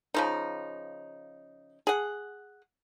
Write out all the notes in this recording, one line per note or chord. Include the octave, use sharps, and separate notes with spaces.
C#3 F3 D#4
G#4 F#5